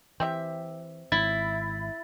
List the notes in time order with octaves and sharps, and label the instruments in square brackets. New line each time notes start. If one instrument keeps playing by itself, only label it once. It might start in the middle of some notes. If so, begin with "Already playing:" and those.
[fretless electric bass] E3 [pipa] C4 G4 E5
[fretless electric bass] G#1 [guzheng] E4 [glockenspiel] A6